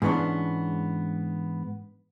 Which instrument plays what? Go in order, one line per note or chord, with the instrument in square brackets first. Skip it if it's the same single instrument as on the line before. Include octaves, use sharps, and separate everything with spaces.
[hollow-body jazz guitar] G#2 E3 B3 C#4 D4